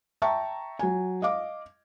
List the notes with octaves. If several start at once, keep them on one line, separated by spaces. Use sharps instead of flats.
E5 G5 A5 A#5 C#6
F#3 G#5
D#5 F5 D6